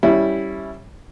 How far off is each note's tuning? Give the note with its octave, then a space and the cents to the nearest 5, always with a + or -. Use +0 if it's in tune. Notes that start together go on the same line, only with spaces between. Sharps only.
G3 -5 C#4 +0 E4 -5